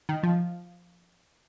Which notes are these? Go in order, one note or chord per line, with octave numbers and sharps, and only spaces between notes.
D#3
F3